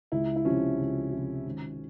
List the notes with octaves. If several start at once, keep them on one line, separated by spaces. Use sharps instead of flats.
C#2 E4
E4
C3 F3 C#4
C#2
C3 F3
G#1